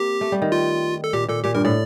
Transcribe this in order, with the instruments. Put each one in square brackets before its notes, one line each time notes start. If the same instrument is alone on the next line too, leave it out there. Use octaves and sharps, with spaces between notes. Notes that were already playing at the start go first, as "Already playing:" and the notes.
Already playing: [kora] A#3 C4 [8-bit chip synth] G4
[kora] A3
G3
D#3
[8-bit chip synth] F4
A4
[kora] A#2 [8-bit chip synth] G4
[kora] A#2 [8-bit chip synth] A4
[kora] A#2 [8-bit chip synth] G4
[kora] G2 [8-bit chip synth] A#4
[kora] A2 [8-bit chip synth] D5